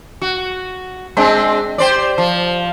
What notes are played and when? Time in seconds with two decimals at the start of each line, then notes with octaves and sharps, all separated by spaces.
0.22 F#4
1.17 G#3 C4 D4
1.78 G4 C5 D5
2.18 F3